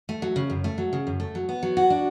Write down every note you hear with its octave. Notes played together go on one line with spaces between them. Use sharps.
A3
F#3
C#3
F#2
A3
F#3
C#3
F#2
A3
F#3
B3
F#3
F#4
D4